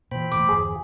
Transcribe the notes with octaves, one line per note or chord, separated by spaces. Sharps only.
A#2 E3 C5 G5 B5
E1 A2 E3 D6
G1 E2 G#4